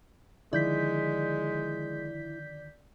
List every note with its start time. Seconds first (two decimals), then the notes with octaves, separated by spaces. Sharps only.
0.53 D3 D#3 F3 G#3 E4 D5 G6 B6